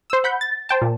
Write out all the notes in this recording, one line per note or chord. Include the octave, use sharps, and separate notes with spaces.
C5 E6
F#5 B5 G6
A6
C5 G5 A5
A#2